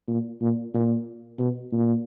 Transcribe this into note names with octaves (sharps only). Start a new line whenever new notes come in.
A#2
A#2
A#2
B2
A#2